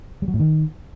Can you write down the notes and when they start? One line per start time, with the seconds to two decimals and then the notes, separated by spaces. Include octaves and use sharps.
0.22 G3
0.28 F#3
0.34 A2
0.40 D#3